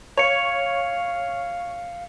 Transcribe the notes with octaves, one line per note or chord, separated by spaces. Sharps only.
C#5 F5 C#7 F7